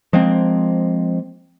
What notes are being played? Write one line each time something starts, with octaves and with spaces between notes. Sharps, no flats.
F3 G#3 A#3 C4